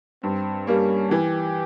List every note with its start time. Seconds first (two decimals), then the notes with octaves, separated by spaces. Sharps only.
0.23 G2 C4
0.67 G3 A#3 C#4
1.11 E3 G4